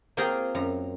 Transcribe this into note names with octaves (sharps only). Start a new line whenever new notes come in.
A#3 C4 F4 G#4 G5 A#5
F#2 A#5